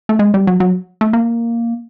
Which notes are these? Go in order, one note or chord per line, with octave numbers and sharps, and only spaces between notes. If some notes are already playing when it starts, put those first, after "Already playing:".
A3
G#3
G3
F#3
F#3
A3
A#3